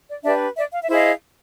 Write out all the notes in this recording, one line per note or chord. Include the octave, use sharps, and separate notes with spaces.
D5
D4 G4 B4 D5 E5
D5 E5
F5
E5
E4 G#4 C5 D#5 F5